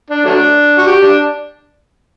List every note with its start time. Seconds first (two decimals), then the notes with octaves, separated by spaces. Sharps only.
0.10 D4
0.25 F#3 A3 D4
0.78 F#4
0.87 G4
1.02 D4